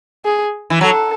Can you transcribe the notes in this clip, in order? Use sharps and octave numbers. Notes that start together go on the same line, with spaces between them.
G#4
E3
F#3 A4